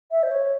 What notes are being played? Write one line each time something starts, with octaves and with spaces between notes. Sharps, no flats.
E5
C5
C#5